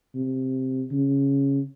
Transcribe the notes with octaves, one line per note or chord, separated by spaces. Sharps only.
C3
C#3